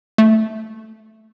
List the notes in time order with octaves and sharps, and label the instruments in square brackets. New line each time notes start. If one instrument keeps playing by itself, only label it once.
[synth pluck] A3